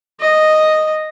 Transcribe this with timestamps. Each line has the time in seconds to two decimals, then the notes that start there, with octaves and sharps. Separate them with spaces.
0.20 D#5